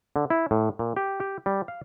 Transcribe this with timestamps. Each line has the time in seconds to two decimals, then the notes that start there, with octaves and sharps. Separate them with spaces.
0.16 D3
0.30 E4
0.51 A2
0.79 A#2
0.96 G4
1.20 G4
1.46 G3
1.68 F5